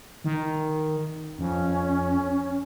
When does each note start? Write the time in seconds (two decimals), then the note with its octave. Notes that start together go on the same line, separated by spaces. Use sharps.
0.24 D#3
1.39 F2 C#4